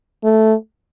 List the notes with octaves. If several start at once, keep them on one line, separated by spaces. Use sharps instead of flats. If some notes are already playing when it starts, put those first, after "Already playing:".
A3